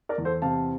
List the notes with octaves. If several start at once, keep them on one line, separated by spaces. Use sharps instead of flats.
A#4 D5
E2
A4 C5
C3 F5 A5